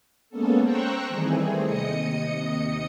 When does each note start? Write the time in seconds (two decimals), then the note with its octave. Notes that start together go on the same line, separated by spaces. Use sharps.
0.29 G#3 A#3 B3 C#4 A4
0.62 C5 G5 A#5 C#6 E6 F#6
1.09 D#3 E3 G3 A3 C4 G#4
1.63 D#2 C3 D#5 D#6 C#7